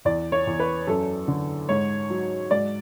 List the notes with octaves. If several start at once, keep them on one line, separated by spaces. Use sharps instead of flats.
E2 D5
C#5
E2
B4
F#2 A4
D3
G#2 C#5
F#3
G#2 D5